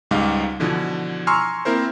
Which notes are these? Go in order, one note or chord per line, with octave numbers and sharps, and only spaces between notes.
C#2 G#2 G3 D#4 F5
B2 D3 E3 F3
G#5 A#5 C6 C#6 E6 F6
A#3 C4 E4 A#4 C5